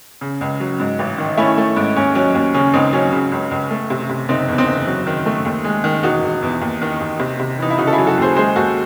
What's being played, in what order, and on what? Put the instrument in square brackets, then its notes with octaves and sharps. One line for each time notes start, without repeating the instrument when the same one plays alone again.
[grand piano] C#3
C#2
F#3
G#2
A1
D#3
A3 C#4 E4
A3
G#2
D#2 C#4
F#3 C#4
D#2 C#4
C#3 C#4
C#2 C4 D#4
F#3 C#4
C#3
C#2
C#2
A3
C3
C3
F#1 C4 D#4
E2
C4 D#4
F#1
F#3
D#3
A3
D#2
G#3
D#3
E1 D#4 F#4
E1
E2
D#2
D#3
D#2
C3
C3
E3 D#4
E4
C#3 D#4 F#4
A4
E4 G#4
F#3
F#4 A4
D#2 G#4 C5
G#3 G#4 C5
D#2 F#4 A4